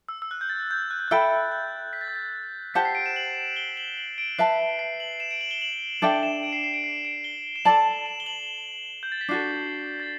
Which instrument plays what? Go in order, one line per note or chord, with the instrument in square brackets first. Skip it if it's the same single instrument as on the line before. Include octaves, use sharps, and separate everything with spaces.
[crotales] E6
E6
F#6
G6
A6
G6
F#6
G6
[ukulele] A4 E5 G5 B5 [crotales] F#6
[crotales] G6
B6
A6
G6
A6
[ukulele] G4 C5 F#5 A5 [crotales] B6
[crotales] C7
D7
E7
F#7
G7
F#7
F#7
D7
[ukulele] B4 E5 A5 [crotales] C7
[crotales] C7
F#7
E7
D7
F#7
G7
F#7
[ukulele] D4 A4 E5 G5
[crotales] E7
D7
C7
C7
D7
C7
D7
G7
E7
[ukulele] A4 D5 A5 [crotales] F#7
[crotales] E7
G7
F#7
G6
A6
B6
[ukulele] D4 F#4 A4 [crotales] C7
[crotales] A6